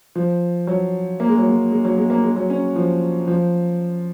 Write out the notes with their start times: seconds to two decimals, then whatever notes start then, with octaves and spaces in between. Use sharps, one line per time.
0.15 F3
0.67 F#3
1.20 A#3
1.28 G#3
1.38 F#3
1.49 G#3
1.71 G#3
1.85 F#3
1.97 G#3
2.10 A#3
2.24 G#3
2.36 F#3
2.50 C#4
2.76 F3
3.28 F3